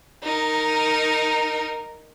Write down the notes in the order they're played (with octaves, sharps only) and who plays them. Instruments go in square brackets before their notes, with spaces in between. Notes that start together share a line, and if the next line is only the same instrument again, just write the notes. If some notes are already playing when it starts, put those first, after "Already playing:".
[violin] D#4 A#4